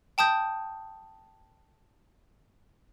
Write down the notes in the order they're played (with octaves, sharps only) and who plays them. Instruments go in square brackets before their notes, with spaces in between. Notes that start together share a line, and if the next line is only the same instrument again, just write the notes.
[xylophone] G5 A5 D#6 G6